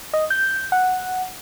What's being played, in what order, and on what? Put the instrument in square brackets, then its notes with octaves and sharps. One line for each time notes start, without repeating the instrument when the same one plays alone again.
[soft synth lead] D#5
G6
F#5